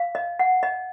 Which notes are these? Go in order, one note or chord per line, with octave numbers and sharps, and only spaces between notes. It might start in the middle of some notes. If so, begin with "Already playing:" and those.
Already playing: F5
D#5
F#5
D#5